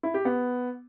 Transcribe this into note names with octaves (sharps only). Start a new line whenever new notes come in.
E4
G4
B3